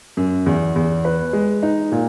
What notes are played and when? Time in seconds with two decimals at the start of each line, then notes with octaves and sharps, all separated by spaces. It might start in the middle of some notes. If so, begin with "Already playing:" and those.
0.17 F#2
0.46 E2
0.76 E2
1.05 B4
1.33 G#3
1.63 D#4
1.92 A#2